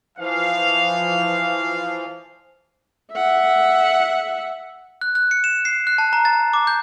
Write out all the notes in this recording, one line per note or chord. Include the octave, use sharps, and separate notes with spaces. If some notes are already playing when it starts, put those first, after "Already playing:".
E3 F3 F5
E5 F#5
F#6
F#6
C#7
E7
C7
F#6
A5
A#5
A6
D6
G6